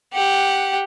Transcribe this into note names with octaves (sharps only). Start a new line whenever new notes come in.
G4 F#5